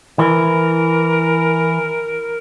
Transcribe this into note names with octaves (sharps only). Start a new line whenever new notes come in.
E3 A#4